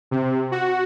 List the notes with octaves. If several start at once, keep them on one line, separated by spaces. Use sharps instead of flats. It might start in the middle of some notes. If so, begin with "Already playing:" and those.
C3
F#4